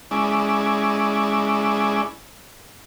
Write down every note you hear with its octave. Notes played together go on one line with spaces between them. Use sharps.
G#3 C#4 E4 D5